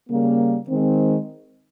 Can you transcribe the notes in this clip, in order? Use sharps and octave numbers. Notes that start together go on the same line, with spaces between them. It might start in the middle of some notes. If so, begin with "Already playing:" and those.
C#3 G3 A#3
D#3 G#3 C4